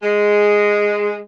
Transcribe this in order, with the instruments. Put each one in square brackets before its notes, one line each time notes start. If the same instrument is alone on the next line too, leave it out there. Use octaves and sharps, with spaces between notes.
[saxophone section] G#3